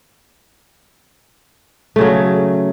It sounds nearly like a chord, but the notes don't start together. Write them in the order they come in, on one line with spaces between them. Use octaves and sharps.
A3 C#3 F#3